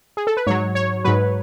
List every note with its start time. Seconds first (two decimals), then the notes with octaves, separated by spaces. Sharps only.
0.17 G#4
0.27 A4
0.37 B4
0.47 G#2 F#3 C#5
0.75 C#5
1.04 G#2 F#3 B4